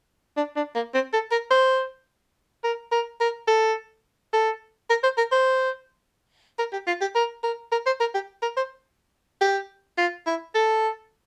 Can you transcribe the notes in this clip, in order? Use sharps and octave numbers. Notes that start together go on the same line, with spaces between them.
D4
D4
A#3
C4
A4
A#4
C5
A#4
A#4
A#4
A4
A4
A#4
C5
A#4
C5
A#4
G4
F4
G4
A#4
A#4
A#4
C5
A#4
G4
A#4
C5
G4
F4
E4
A4